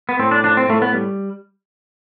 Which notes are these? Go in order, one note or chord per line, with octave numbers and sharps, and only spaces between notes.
B3
A2 C4
D4
F3 D4
C4
A2 A3
B3
G3